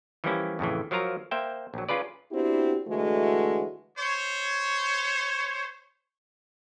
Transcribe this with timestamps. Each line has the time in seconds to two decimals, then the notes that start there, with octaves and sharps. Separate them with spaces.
0.24 E3 F3 G3 A#3 C#4 E4
0.59 F2 A2 C#3 E3
0.91 F3 F#3 F4 A#4 A#5
1.31 A#3 C5 E5 G5
1.74 A#1 F#3
1.89 C#4 F4 G#4 B4 D5
2.32 B3 C4 D4 E4 F#4 G4
2.87 D3 E3 G#3 A3 F#4
3.98 C5 C#5